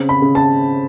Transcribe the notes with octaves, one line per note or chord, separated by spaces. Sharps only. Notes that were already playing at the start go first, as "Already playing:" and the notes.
Already playing: C#3 C4
B5
C#3
A5